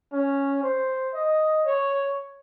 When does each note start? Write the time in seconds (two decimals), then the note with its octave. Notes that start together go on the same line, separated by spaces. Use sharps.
0.13 C#4
0.63 C5
1.14 D#5
1.66 C#5